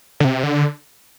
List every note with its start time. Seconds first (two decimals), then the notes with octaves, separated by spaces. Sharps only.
0.20 D3
0.24 C3
0.43 D3